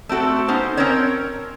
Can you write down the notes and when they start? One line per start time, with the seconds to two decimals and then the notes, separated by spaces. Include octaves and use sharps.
0.09 A3 C4 F#4 A4
0.48 B3 C#4 D#4 C5
0.77 C4 C#4 A#4 C5 C#5